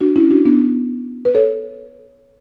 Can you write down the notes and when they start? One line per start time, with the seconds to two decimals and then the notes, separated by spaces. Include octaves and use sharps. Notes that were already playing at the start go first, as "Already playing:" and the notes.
0.01 D4 F#4
0.16 C#4 E4
0.31 D4 F#4
0.45 B3 D4
1.25 B4
1.35 A4 C#5